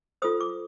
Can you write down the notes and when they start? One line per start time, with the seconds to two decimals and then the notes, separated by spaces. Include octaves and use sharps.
0.22 F4 A4 C5 D#6
0.40 D6